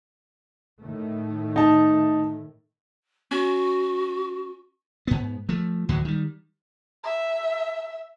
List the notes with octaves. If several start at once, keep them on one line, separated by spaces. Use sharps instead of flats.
A2 D#3 A3
D#4 A5
C#4 F#4
G#2 B3
F3 A3
D2 A2 E3 F#3
D#3 G3
E5